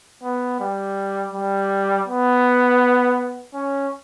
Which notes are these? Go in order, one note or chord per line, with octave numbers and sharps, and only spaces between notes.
B3
G3
G3
B3
C#4